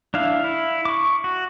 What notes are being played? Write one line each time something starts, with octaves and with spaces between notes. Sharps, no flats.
D4 E4 F5
E4
C#6 D6
F#4